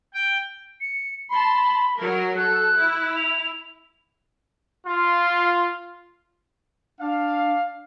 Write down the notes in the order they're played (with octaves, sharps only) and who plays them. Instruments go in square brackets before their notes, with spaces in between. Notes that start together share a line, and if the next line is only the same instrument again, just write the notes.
[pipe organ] G5
[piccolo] C#7
[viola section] A5 C6 [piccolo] B5
[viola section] F#3 A#4
[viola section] A4 [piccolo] F#6
[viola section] E4
[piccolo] F7
[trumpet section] F4
[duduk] D4 [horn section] F5